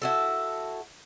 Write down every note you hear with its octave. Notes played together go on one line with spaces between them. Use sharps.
E4 F#4 A4